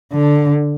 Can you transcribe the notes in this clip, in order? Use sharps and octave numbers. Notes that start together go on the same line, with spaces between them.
D3